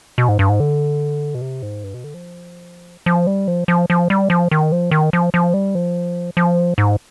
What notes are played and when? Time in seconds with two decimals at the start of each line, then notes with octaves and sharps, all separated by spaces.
0.18 B2
0.29 G#2
0.39 G2
0.49 G#2
0.60 D3
1.35 B2
1.41 C3
1.63 G#2
1.84 G2
1.94 B2
2.04 D3
2.14 F3
3.06 F3
3.27 G3
3.48 F3
3.68 F3
3.90 F3
4.10 G3
4.30 F3
4.51 D#3
4.72 F3
4.91 D#3
5.13 F3
5.34 F3
5.54 G3
5.75 F3
6.37 F3
6.78 G#2